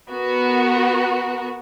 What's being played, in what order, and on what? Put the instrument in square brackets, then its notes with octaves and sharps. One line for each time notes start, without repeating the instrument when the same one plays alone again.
[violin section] B3 F#4 A#4